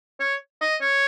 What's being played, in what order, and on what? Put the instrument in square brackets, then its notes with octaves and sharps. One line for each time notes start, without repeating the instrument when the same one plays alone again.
[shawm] C#5
D#5
C#5